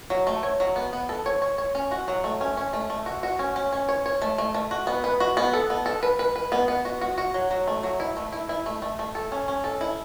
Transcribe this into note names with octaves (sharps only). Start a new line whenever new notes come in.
F#3
A3
C#5
F#3
B3
B3
A4
C#5
C#5
C#5
C#4
F#4
F#3
A3
C#4
C#4
A3
A3
F#4
F#4
C#4
C#4
C#4
C#5
C#5
A3
A3
A3
F#4
B3
B4
F#4
B3
A4
B3
A4
B4
B4
B4
B3
B3
F#4
F#4
F#4
F#3
F#3
A3
F#3
E4
A3
E4
E4
A3
A3
A3
A4
C#4
C#4
A4
E4